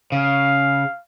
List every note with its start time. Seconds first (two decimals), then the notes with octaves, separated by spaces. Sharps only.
0.12 C#3 F5